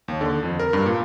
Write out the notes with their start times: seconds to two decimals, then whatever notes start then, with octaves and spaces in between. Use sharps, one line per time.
0.08 D#2
0.21 D3
0.43 F2
0.59 A#4
0.73 G2
0.86 A#2